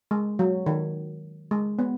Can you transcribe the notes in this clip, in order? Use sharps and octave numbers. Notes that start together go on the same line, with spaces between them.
G#3
F#3
D#3
G#3
B3